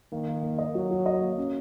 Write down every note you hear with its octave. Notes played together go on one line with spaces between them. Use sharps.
D#3 A#3
A#3
A#3
D#5
F#3 F#4
F#4
D#5
A#3
C#4